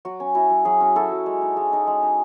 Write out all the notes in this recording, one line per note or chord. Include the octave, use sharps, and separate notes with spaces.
F#3 F#4
C#4
E4 F#4
F#3
F#3 G#4
C#4
E4 F#4 A4
F#3
G#3
D#4
G#3
D#4
G#3
D#4